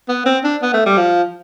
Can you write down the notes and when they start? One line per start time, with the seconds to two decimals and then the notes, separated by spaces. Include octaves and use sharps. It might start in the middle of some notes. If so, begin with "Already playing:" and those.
0.08 B3
0.26 C4
0.44 D4
0.62 B3
0.73 A3
0.86 G3
0.97 F3